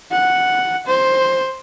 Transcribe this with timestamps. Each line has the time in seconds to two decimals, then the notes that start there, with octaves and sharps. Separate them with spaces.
0.11 F#5
0.87 C5